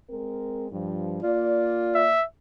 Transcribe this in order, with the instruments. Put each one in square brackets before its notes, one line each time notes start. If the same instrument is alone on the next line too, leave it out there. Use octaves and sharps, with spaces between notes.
[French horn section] G#3 C4 A#4
G2 F3
[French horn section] A#3 D5 [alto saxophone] F4
[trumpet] E5